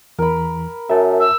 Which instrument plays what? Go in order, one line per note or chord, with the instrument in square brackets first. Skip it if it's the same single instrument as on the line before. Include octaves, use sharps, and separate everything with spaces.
[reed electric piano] E2 E3 [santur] A#4 B5
[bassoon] F#2 [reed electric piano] E5 A5
[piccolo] E6